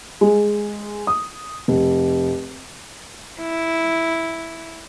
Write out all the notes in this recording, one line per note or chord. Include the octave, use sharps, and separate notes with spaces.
G#3
D#6
F1
E4